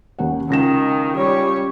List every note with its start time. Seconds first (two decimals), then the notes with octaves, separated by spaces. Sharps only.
0.19 D#2 C#4 F#5
0.50 C#2 D#3 A#6 E7
1.17 G3 C#5